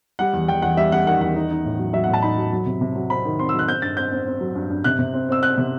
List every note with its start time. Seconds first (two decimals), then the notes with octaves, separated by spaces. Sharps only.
0.19 G3 F#5
0.34 E2
0.48 E2 G5
0.62 E2 F#5
0.77 G3 E5
0.92 G3 F#5
1.06 D#3 F#5
1.21 E2 F#5
1.36 D#4
1.51 D#4
1.65 A2
1.79 F#3
1.93 F#3 E5
2.04 F#5
2.08 A2
2.13 A5
2.22 D#4 B5
2.37 F#3
2.52 F#3
2.66 C3
2.81 C3
2.96 F#3
3.10 C4 B5
3.25 D#3
3.39 C4 C6
3.49 E6
3.54 F#3 F#6
3.68 C4 G6
3.82 G2 A6
3.97 C4 G6
4.12 C4
4.27 C4
4.41 F#3
4.55 G2
4.70 G2
4.84 C3 F#6
4.99 C3
5.13 C4
5.29 C4 E6
5.42 C4 F#6
5.58 C3